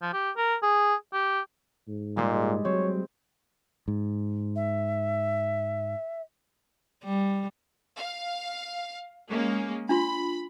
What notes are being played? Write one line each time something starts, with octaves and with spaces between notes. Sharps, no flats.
F3
G4
A#4
G#4
G4
G#2
A#2 G3 G#3
F#3 C4 C#5
G#2
E5
G3
F5
G#3 A#3 C#4
D4 F4 B5 C6